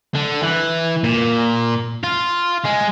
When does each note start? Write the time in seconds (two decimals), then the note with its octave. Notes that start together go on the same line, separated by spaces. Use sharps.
0.15 D3
0.43 E3
1.04 A#2
2.04 F4
2.65 G#3